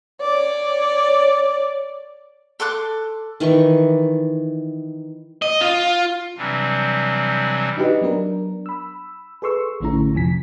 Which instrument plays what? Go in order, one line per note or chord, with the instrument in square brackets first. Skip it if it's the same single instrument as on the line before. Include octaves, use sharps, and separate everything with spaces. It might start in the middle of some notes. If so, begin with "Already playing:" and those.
[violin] C#5 D5
[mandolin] A4 C6 D6 F#6
[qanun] D#3 E3 D5 C#6
[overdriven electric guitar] D#5
F4
[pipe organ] C3 E3 F#3 G3 C4 D4
[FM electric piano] D4 D#4 F#4 G4 B4 D#5
F#3 B3 D4 A#4
B5 E6
G#4 A4 B4 C6 C#6 E6
A1 D3 A3 C#4 E4 A#5
F2 C3 F3 G#5 B6